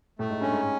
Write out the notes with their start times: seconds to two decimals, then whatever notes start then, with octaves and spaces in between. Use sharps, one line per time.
0.19 A2 A3
0.30 G#2
0.41 G2 C#4
0.52 G#2